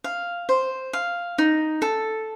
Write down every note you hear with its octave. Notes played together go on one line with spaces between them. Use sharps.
F5
C5
F5
D#4
A4